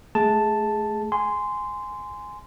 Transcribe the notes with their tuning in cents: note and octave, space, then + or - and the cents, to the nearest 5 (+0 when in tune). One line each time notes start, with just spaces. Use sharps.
A3 -25 G#4 +0 A5 +0
G#5 +0 C6 -15